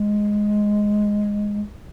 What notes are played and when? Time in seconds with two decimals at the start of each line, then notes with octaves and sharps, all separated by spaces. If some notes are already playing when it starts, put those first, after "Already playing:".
Already playing: G#3